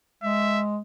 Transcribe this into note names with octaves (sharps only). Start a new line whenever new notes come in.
G#3 E5